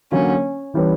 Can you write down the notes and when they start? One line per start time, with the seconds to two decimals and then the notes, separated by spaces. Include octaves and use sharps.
0.12 D3 F#3 A#3 C#4
0.74 E3 G3 C#4 G4 B4